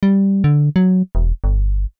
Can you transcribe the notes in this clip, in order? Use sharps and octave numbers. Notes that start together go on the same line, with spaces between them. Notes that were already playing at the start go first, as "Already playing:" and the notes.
G3
D3
F#3
E1
G1